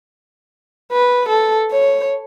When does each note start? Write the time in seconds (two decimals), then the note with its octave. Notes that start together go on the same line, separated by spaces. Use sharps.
0.92 B4
1.29 A4
1.72 C#5